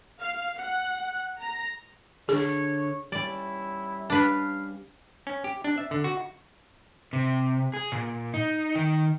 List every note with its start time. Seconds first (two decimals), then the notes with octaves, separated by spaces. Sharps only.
0.21 F5
0.59 F#5
1.41 A#5
2.29 D3 D4 G#4 C#5
3.12 G3 C#4 E4 D5
4.10 D4 B4 F5
5.27 C#4
5.44 G4
5.64 D4
5.78 E5
5.91 D3
6.04 F#4
7.13 C3
7.74 G#4
7.92 A#2
8.34 D#4
8.75 D#3